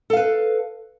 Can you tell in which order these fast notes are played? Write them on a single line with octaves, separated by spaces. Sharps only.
A4 F5 B4